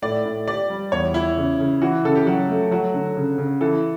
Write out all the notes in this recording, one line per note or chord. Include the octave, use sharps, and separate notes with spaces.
A2 D5
A2
G4 D5
G3
E2 C#5
E3 E4
C#3
C#3
E3 F#4
C#3 A4
G4
F#3 F#4
A3
F#3 F#4
D3
C#3
C#3
E3 A4